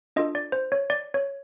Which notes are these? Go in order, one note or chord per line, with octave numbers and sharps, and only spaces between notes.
D4 F4 A4 D#5
D5
C5
C#5
D5
C#5